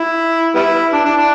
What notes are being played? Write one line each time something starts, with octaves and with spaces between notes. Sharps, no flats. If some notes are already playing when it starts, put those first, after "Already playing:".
Already playing: E4
G3 B3 E4
D4
D4
D4